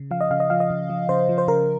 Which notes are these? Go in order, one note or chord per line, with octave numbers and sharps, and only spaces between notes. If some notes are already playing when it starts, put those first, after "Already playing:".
Already playing: C#3
F3 F5
D#5
C#3 F5
D#5
F3 F5
D#5
C#3
F3
C#3 C5
F3
C5
C#3 A#4